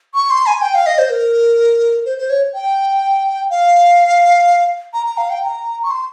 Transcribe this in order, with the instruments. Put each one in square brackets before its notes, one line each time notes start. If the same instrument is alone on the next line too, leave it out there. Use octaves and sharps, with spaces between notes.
[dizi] C#6
C6
G#5
G5
F5
D#5
C5
A#4
C5
C5
C#5
G5
F5
A#5
A#5
F5
G5
A#5
C#6
C6